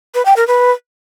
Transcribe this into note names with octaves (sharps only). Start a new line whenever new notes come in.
B4
G5
A#4
B4